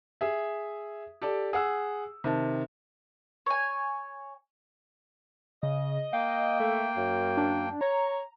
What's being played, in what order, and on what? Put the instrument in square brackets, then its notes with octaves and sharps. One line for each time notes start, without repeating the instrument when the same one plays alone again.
[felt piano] G#4 E5
G4 A4 D5
G#4 F#5 E6
C3 D#3 A5
[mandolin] C#5 G#5
[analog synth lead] C#3 [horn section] D#5
[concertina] A#3 G5 [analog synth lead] F5
[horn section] A3
F#2
[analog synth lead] D4
[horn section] C#5 [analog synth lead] A#5